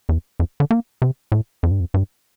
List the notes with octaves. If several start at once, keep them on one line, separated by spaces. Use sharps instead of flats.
E2
F2
D3
A#3
C3
A2
F2
G2
F2
G2